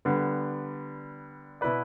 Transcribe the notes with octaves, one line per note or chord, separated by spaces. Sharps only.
D3 G3 B3
B2 B3 E4 B4 D5